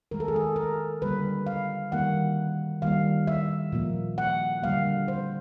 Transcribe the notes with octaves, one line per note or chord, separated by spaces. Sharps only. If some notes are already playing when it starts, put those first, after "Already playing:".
D#3 G#3 A#4
A4
G#4
A4
A#4
D3 G3 A#3 B4
F5
D#3 G3 A#3 F#5
D#3 G3 A#3 F5
E5
A#2 F3 A#3
F#5
D3 G3 A#3 F5
C5